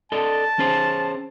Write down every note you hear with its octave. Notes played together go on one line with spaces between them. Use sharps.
A4 D5 D#5 A5
C#4 G#4 C5